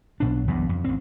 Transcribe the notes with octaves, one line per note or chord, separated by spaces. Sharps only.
B1 B2 D4
B1 E2 G2
F2
A1 C4